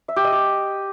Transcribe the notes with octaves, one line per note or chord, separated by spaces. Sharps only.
E5
G4
D#5
G4